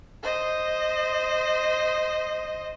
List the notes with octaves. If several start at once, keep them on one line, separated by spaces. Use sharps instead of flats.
C5 D#5